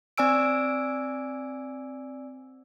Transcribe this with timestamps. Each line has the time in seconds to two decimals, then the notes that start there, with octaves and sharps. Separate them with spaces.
0.18 C4 D5 G#5 E6 D7